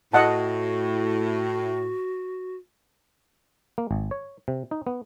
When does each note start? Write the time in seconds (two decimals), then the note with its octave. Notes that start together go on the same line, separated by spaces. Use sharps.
0.14 A2 F#4 D#5 F#5 A5
3.78 A#3
3.91 G#1
4.11 C#5
4.48 C3
4.71 D#4
4.87 B3